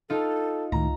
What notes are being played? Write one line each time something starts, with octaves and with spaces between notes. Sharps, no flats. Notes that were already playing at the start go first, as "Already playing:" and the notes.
D#4 F4 A4
C#2 A2 D#3 A#5